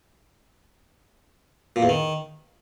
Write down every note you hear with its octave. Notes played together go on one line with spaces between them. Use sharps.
A#2
E2
D#3